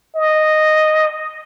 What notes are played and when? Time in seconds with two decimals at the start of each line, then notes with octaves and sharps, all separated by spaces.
0.16 D#5